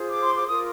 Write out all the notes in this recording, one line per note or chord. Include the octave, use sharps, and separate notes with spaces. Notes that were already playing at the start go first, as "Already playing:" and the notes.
Already playing: F4 G#4 C5
D6
C6
D6
F4 A#4 D#6